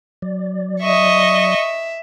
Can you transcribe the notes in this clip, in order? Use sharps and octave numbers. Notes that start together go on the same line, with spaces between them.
F#3 D5
D#5 E5 C#6